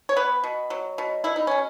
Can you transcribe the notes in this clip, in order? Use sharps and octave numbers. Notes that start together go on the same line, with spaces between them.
C#5
B3 B4
B2
F#3
B2
B2 E4
D#4
B2 C#4